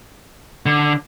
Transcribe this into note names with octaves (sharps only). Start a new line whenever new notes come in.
D3